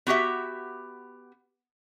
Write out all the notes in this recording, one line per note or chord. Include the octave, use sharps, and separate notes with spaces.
B3 F#4 G4 E5